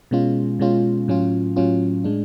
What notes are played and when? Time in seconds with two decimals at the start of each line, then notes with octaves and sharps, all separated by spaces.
0.11 B2 G#3 C#4 F4
0.59 B2 G#3 C#4 F4
1.08 A2 F#3 C#4 F4
1.56 A2 F#3 C#4 F4
2.04 A2 G#3 D4